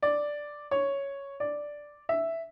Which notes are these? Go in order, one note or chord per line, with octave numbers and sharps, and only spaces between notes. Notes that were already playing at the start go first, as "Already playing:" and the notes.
D5
C#5
D5
E5